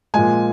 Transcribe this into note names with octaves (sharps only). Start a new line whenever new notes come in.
A#2 F3 G#3 G#5